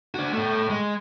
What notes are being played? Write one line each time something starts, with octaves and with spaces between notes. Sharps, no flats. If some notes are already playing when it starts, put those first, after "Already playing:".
D4 F#4
A2 A3
G#3